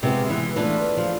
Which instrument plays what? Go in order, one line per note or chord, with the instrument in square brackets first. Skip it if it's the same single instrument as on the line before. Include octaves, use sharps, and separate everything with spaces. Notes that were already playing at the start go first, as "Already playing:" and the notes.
[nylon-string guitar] C3 [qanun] G#3 B3 F4
[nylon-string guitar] E3
[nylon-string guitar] E3 [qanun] A3 D4 F4 B4
[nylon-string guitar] F3